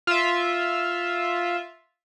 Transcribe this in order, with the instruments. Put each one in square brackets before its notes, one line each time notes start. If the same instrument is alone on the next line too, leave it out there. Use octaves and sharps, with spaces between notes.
[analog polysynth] F4 E5